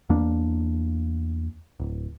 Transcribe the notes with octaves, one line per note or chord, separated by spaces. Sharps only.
E2 A#3 D4
D1